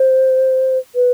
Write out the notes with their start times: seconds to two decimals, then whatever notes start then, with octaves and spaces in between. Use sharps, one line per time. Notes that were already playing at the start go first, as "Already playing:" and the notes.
Already playing: C5
0.95 B4